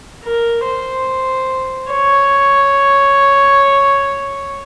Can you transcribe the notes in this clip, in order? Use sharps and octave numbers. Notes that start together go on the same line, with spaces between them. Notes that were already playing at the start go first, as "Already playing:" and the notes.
A#4
C5
C#5